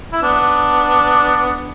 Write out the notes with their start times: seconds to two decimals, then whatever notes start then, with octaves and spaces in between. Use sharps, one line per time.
0.12 E4
0.22 B3 D4